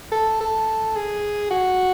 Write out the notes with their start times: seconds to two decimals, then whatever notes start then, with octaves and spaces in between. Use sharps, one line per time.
0.12 A4
0.40 A4
0.96 G#4
1.51 F#4